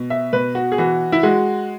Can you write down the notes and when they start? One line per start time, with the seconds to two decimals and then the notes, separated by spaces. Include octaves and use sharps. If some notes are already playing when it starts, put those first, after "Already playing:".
Already playing: B2
0.10 E5
0.33 B2 B4
0.55 F#4
0.72 G#4
0.78 E3 F#4
1.12 E4
1.23 G#3 F#4